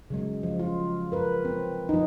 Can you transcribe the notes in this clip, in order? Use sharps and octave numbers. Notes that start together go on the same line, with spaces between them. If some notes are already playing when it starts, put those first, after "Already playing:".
C#3 F#3 G#3
F3
F4
A#4 B4
C4
F3 D#4